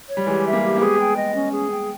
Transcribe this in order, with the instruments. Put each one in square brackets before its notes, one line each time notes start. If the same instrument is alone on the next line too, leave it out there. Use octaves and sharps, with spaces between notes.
[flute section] C#5
[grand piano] G3
[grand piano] E3 G#3 [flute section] G4
[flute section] E5
[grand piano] G3 A#3
[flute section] G4
[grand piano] A#3
[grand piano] G#3 B3 [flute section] G#4
[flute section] G5
D#5
C#4
G#4
G5